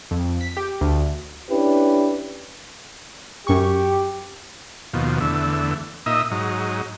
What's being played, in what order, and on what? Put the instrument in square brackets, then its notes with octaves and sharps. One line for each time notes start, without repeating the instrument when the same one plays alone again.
[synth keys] F2
B6
G4
D2
[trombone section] C#4 D4 E4 G4 B4
[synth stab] F#2 C#6 [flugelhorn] G4
[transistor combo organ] D#2 B2 F3
E2 D3 A3
A#2 D#4 D#5 E5
G#2 F#3 D#4